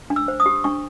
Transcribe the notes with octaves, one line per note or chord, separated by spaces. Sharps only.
D4
E6
C5
D#6
G4
D4 C#6